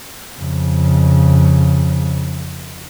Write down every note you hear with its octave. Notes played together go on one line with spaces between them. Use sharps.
F2 C#3